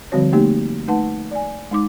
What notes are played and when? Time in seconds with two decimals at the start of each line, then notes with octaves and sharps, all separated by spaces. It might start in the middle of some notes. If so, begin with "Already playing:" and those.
0.12 D3 F3 G3 C4 F#4 C#5
0.33 A3 A#3 D#4 G4
0.88 A3 D#4 B4 F#5 A5
1.31 D5 G#5
1.71 G#3 D#4 D6